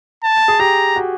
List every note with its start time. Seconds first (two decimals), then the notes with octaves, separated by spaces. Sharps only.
0.23 A5
0.48 G#4
0.60 G4 A#5
0.96 F#4